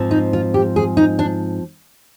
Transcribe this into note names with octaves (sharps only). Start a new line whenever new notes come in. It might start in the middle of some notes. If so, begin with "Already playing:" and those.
Already playing: G#2 F3 C4
D#4
F4
G4
G#4
D#4
D4